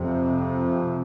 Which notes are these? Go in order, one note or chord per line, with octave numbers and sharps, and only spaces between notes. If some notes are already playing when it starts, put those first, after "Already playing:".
Already playing: F2 C3